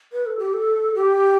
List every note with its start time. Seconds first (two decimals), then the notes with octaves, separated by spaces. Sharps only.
0.12 B4
0.26 A4
0.39 G4
0.53 A4
0.95 G4